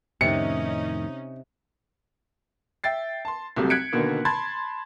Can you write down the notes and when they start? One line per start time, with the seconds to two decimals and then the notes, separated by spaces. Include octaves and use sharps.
0.21 F2 A2 C3 D#3 C#4 D#4 C#7
2.84 E5 G5 A6 C7
3.25 A5 C6
3.56 C2 C3 F#3 G3 A3
3.70 F#6 G#6 B6 C#7 D7
3.93 B2 D3 D#3 A#3 B3
4.25 A5 B5 C6 G#6 A6